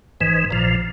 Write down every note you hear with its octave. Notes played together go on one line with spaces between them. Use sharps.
G#1 G#2 E3
A#1 A#2 F3